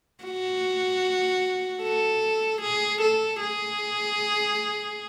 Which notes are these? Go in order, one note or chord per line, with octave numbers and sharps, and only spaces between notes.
F#4
A4
G#4
A4
G#4